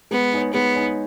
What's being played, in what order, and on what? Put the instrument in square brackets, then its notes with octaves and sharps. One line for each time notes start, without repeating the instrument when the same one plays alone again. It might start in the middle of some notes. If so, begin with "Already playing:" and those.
[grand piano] G#3 [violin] B3
[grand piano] D#4 G#4 C#5
[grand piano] G#3 [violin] B3
[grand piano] D#4 G#4 C#5